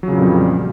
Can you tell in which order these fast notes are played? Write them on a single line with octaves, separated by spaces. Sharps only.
F#3 C#3 A#2 F2 G3